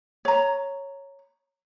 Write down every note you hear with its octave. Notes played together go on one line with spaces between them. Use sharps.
C#5 A#5